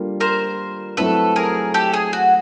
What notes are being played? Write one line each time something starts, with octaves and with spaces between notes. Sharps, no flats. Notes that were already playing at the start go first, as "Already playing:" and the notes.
Already playing: G3 A#3 D4 F4 A4
A#4 C5
F#3 A3 C4 E4 A4 B4
G#4 A#4
G4 A4
G#4
F#4